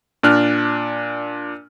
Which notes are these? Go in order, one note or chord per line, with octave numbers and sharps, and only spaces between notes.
A#2 D4 F6 F#6